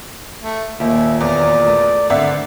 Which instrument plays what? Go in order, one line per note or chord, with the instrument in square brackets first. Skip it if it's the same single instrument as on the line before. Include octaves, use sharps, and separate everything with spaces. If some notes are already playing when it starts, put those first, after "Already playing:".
[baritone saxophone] A3
[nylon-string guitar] D#2 [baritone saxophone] A#2 [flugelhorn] E5
[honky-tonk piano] E2 [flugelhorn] D5
[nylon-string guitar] A3
[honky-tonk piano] G#1 D5 E5 [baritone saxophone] D3 [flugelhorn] F#5